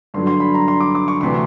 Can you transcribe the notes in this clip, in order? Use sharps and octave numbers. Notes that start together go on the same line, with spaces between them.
G2 D3 F#3 C6
C6
B5
A#5
C6
D6
D6
C#6
D2 C3 E3 C6